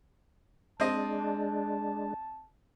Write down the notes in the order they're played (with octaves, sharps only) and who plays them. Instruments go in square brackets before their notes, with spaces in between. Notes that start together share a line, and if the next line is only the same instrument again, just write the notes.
[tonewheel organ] G#3 D4 [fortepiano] C4 D#5 [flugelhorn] A5